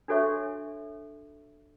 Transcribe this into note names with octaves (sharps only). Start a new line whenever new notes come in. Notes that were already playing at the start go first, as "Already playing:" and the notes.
D4 F#4 A4 C#5 E5 C#6